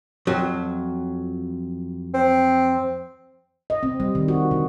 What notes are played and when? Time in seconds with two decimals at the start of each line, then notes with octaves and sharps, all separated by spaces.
0.27 F2 F#3
2.14 C4
3.70 D#5
3.83 C4
4.00 G3
4.15 D#3
4.28 F#4
4.51 D3